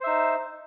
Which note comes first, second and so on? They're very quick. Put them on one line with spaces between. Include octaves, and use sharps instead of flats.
C5 E5 D#4